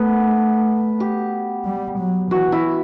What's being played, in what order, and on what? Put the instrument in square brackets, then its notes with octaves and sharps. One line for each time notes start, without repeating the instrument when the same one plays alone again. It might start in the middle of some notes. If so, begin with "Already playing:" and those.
Already playing: [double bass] A3 [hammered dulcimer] B3
[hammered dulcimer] G4
[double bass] G3
F#3
[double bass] E3 [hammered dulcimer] F#4
[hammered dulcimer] E4